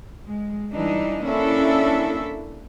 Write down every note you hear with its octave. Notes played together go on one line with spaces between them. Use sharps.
G#3
E3 G3 D4 D#4
A#3 C#4 D4 E4 A4 E5